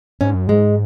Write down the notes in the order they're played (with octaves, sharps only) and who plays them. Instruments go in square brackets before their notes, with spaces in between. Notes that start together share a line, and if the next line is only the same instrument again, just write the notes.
[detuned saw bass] G#2 [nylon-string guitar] C#4
[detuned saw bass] F#2
[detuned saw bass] G#2 [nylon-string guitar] G#3